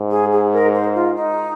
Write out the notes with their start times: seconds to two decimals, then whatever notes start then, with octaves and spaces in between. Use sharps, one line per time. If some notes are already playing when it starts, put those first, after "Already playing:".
Already playing: G#2
0.11 G#4
0.32 G#4
0.52 A#4
0.74 C5
0.95 F4
1.16 D#4